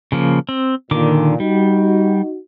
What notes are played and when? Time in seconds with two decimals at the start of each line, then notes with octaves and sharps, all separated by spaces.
0.12 C#3 F3 A#3
0.49 C4
0.91 A#2 D3 D#3 D6
1.40 G3 D#4 F#4